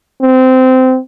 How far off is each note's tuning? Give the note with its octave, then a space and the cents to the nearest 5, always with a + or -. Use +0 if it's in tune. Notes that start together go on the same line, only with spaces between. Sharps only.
C4 -20